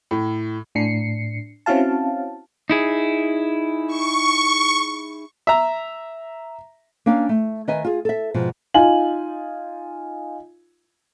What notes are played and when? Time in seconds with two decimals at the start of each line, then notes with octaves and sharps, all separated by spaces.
0.11 A2
0.75 A2 D4 C7 C#7
1.66 C4 C#4 E4 F#4 F5 A5
2.70 D#4 E4 G#4
3.87 C#6
5.47 E5 A#5
7.06 A#3 C#4 D4 F5
7.29 A3
7.68 D#3 B4 D#5 E5 G#5
7.85 F4 G#4
8.05 A4 E5
8.34 G#2 B2 F3
8.74 D#4 F4 G#5 F#7